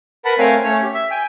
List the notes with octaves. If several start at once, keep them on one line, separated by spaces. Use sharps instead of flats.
A#4 B4 F#5 A5 B5
A3 C4 A#4 C#5 F5 G#5
A3 C#4 C#5
G4
E5
G5 G#5